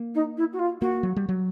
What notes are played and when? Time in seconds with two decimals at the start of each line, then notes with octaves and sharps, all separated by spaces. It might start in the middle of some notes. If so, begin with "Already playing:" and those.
Already playing: A#3
0.15 D#4
0.37 E4
0.53 F#4
0.59 F4
0.81 A#3 F#4
1.03 F#3
1.16 G3
1.29 F#3